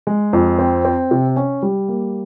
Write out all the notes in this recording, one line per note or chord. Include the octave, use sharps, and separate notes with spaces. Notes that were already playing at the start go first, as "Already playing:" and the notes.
G#3
F2
C4
C4
C3
C#4
G3
A#3